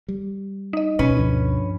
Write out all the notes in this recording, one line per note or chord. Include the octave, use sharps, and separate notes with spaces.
G3
D#4 D#5
D2 B2 C#4 B4
G2 F3 D4